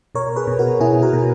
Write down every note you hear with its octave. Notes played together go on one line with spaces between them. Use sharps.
B2 A#4 C#5
G#4 B4
B2
F#4 A#4
B2 E4 G#4
F#4 A#4
B2